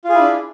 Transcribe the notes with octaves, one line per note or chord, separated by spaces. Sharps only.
D4 E4 F4 G#4